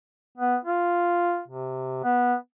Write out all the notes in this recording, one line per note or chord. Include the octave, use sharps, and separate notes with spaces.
B3
F4
C3
B3